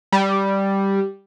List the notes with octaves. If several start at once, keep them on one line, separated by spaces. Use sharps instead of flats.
G3